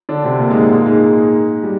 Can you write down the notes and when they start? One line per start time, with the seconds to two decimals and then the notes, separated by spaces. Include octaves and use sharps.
0.09 D3 D4
0.24 C3 C4
0.40 A#2 A#3
0.50 G#2 G#3
0.71 A#2 A#3
0.86 G#2 G#3
1.64 G3